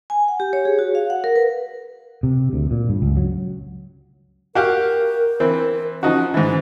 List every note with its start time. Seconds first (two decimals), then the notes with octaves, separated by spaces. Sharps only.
0.10 G#5
0.28 F#5
0.40 G4
0.53 C#5
0.65 G#4
0.79 F#4
0.95 F5
1.10 F#5
1.24 A#4
1.36 B4
2.23 C3
2.53 D2
2.71 A#2
2.89 G2
3.02 C#2
3.16 F#3
4.55 F#4 G4 A#4 F5
5.40 E3 C4
6.03 F3 C#4 D#4 F#4
6.34 G#2 D#3 E3